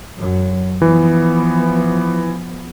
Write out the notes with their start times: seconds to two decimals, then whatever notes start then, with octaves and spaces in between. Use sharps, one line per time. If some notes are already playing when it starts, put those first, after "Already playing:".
0.17 F#2 F#3
0.82 E3 F3 B3